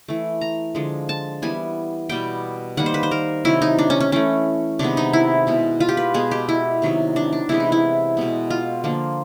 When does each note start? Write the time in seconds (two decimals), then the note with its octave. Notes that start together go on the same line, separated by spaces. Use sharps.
0.08 E3 A3
0.41 A#5
0.75 D3 F3 G#3
1.09 A5
1.42 E3 G3 B3 G#5
2.09 B2 G3 B3 G5
2.77 D#3 G3 A#3 F#5
2.86 C5
2.94 B4
3.03 C5
3.11 A#4
3.45 C3 D#3 F#3 E4
3.62 D#4
3.79 D4
3.90 C#4
4.00 C#4
4.12 E3 A3 C#4
4.79 C3 D#3 G#3 B3 D4
4.97 D#4
5.13 E4
5.47 B2 G#3 B3
5.80 F4
5.89 G4
5.97 B4
6.14 B2 G#3 B3 G#4
6.31 G4
6.49 E4
6.82 C3 D#3 F#3 B3
7.16 D4
7.32 D4
7.49 C3 E3 G#3 B3 E4
7.60 D#4
7.72 E4
8.17 B2 G#3 B3
8.50 F4
8.84 D3 F3 A#3